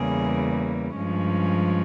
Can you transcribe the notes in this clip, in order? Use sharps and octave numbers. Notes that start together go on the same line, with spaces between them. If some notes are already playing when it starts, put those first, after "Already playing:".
Already playing: E2 C#3 G3 A#3 G#4
G2 F3 G#3 C#4